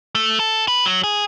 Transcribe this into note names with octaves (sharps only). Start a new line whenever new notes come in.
A3
A4
B4
F#3
G#4